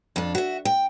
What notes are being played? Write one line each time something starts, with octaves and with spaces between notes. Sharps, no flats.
F2 D4
F#4 E5
G5